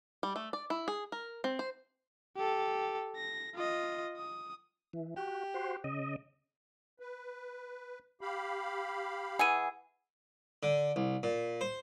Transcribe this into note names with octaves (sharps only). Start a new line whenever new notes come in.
G3
A3
D5
E4
G#4
A#4
C4
C5
G4 A4
A#6
F4 D#5
D#6
E3
F#4 G4
F#4 C5
C#3 D#5
B4
G4 F5 B5
E3 G#4 F#5 E6 D#7
D3
C2
A#2
C5